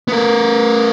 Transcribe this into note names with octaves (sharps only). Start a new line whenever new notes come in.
B3 A#4